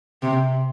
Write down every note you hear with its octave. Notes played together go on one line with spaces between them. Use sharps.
C3